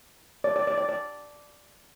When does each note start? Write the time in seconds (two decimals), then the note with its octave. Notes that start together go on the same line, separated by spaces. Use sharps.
0.44 D5
0.56 D5
0.67 D5
0.77 D5
0.89 D5